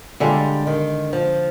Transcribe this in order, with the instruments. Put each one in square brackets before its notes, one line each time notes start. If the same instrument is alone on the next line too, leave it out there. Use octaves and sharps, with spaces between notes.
[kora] D3 G#3 D4 F4 [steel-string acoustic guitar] G3
[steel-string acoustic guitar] D#3
F3